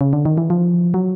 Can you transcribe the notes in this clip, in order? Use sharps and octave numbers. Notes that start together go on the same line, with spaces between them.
C#3
D3
D#3
E3
F3
F#3